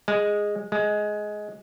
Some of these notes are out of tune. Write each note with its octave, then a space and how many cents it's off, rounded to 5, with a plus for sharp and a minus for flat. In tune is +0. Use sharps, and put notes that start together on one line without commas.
G#3 -10
G#3 +10